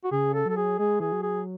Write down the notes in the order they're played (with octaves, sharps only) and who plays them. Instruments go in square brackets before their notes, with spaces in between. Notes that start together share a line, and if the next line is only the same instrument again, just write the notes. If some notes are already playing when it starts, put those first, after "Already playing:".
[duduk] F#4
[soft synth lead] C#3 [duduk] G#4
[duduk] A4
[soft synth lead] F#3 [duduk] A4
[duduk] G#4
[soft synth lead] G#3 [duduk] G#4
[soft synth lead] E3 [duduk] G#4
[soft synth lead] F#3
[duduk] G#4